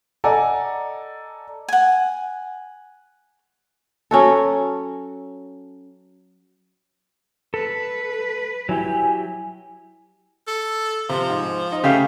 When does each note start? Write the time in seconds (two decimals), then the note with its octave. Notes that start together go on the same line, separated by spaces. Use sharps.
0.24 A4 D5 D#5 F#5 G#5 A#5
1.68 F#5 G#5
4.11 F#3 C#4 F#4 A4
7.54 A4 B4
8.69 F#3 E4 G4 G#5
10.47 A4
11.09 C3 F3
11.30 G#2
11.72 D#4
11.84 C#3 A3 G4 E5 F5